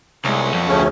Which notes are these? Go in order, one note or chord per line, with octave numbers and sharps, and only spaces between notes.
C2 G#3 B3 C#5
F2
D2 A3 C#4 G#4